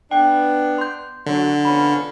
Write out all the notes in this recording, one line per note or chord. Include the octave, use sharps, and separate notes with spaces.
B3 D4 G5
C6 G6
D3 F#3
F3 B3 C#4 B5